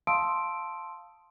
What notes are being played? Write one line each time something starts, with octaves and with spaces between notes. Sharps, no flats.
F5 A5 C6 D#6 E6 D7